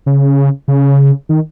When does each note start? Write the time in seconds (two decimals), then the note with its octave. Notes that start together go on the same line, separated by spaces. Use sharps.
0.06 C#3
0.68 C#3
1.29 D#3